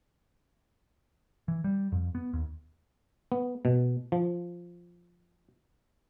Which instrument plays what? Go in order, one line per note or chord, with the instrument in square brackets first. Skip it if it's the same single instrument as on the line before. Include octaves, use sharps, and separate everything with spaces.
[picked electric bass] E3
G3
F2
B3
D#2
[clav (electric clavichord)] B3
B2
F3